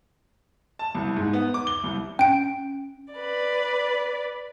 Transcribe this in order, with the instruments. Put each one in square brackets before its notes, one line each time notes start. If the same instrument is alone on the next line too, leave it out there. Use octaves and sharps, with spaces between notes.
[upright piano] A5
C2
G#2
B3
D6
G7
C2
[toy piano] C#4 [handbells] G5 D7
[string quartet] B4 D5